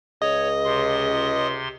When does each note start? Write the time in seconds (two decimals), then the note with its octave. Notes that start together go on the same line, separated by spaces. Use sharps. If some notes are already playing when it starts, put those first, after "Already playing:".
0.22 C#2 C#3 C#5 D#5
0.64 C3 C6